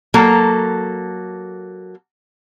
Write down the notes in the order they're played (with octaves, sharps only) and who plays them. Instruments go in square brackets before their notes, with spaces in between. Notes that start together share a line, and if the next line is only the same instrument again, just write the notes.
[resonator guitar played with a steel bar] F#3 A#3 A4